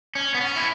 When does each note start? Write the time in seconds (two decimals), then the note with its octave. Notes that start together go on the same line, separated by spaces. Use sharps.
0.15 C#4
0.34 B3
0.41 C#4
0.56 E4